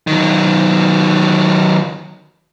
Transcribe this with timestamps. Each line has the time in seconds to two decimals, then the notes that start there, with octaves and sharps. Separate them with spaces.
0.07 D#3 F#3